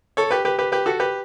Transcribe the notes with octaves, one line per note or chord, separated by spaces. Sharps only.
A4 C#5
G4 B4
G4 B4
G4 B4
G4 B4
F#4 A4
G4 B4